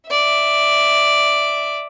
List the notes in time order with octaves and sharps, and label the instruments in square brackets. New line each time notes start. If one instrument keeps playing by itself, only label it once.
[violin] D5 E5